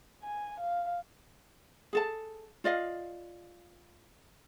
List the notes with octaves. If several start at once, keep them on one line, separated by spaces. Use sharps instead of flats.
G#5
F5
G#4 A4 A5
F4 D5 D#5 F5